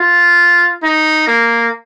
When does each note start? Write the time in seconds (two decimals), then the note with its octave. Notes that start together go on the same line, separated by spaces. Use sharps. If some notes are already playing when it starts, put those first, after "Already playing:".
Already playing: F4
0.83 D#4
1.27 A#3